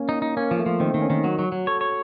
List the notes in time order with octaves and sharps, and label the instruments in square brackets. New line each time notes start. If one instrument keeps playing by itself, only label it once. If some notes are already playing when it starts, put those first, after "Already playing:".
Already playing: [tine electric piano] A#3 C#4
[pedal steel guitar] D#4
D#4
[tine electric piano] A#3 [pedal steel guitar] C#4
[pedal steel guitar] F3
[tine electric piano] A3
[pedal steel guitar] F3
[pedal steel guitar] D#3 [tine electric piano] C4
[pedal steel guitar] D#3
[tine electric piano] C#4
[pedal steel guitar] D#3
[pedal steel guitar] F#3 [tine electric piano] F#4
[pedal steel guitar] F#3
F#3
[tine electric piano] A4 [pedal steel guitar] C#5
[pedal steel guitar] C#5